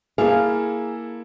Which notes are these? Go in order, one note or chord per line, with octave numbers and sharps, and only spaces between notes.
A#3 E4 G#4 A4 F5